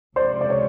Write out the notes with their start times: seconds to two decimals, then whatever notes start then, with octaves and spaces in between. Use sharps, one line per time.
0.16 C#2 C3 F3 C5 D5
0.41 D5
0.50 C#5